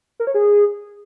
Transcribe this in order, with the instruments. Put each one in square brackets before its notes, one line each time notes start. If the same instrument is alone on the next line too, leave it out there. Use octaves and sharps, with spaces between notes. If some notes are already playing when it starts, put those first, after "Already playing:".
[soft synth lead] A#4
C#5
G#4